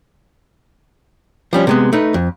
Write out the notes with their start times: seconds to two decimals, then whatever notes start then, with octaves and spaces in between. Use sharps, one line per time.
1.53 F3 G3 C#4
1.67 C3 G#3 B3
1.93 A3 D#4 B4
2.14 F2